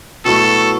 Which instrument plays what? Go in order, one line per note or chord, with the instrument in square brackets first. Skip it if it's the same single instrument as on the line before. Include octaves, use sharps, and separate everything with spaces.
[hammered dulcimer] B2 F#3 A3 E4 [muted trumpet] A4